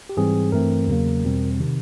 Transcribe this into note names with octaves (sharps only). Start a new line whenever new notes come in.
G4
G#2 E3 G3 C4 G#4
G2 E3 A3 C4 A#4
E2 C#3 F#3 A#3
E2 B2 G3 C4
C3 D#3